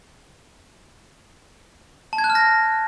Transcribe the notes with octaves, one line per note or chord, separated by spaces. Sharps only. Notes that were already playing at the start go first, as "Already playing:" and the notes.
A5
G#6
F#6
F6
A#6